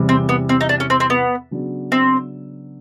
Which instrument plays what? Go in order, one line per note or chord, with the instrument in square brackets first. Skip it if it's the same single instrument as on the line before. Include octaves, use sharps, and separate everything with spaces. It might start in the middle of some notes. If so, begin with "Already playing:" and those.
Already playing: [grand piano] E2 C3 E3 G3
[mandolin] C4
B3
C4
D#4
D4
C#4
C4
C4
B3
[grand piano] C#3 F#3 B3 D4
[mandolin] C4